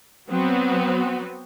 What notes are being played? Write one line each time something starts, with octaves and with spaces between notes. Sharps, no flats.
F#3 B3 C4 F#4